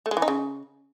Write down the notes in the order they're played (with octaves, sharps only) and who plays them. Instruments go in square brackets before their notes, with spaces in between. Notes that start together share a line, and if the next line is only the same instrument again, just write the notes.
[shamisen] A3
G#3
E3
D#4
C#3